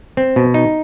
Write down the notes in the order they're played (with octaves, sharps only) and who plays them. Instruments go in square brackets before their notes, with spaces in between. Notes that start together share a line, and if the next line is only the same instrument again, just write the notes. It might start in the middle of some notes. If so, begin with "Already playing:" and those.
[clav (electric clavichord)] C4
B2
D#4